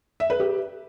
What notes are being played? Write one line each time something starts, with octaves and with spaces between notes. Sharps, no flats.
E5
B4
G4